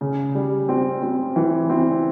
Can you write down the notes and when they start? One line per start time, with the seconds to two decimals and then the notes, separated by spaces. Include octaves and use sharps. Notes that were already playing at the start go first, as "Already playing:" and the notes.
0.01 C#3
0.35 G3
0.69 C4
1.02 C4
1.36 E3
1.70 C4